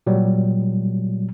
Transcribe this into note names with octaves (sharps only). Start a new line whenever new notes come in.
A#2 F#3 G3